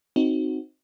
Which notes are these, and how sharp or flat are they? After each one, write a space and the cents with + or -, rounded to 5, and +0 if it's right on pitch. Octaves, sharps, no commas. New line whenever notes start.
C4 +0 D#4 +0 F#4 +0